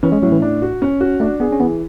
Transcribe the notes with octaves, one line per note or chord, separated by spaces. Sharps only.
E3 C#4
G#3
A2 F#3
E3
D4
F#4
C#4
F#4
A3 D4
B3 G#4
C#4
E3 B3